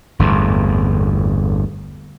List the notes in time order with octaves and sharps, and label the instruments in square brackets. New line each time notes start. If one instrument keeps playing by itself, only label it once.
[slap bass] G1 E2 A2